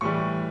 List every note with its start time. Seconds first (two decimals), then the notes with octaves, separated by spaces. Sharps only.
0.01 A2 E3 G3 C#6